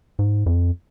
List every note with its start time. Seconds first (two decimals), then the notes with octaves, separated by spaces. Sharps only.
0.19 G#2
0.46 F2